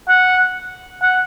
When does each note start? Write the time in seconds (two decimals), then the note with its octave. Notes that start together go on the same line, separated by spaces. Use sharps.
0.09 F#5
1.02 F#5